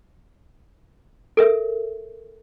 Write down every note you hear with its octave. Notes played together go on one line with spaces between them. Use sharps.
A4 A#4 E5